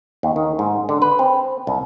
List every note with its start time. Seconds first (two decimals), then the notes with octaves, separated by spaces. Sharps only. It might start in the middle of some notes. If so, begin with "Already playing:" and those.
0.23 D#2
0.36 D#3
0.59 G#2
0.89 D3
1.02 B4
1.19 C4
1.67 C2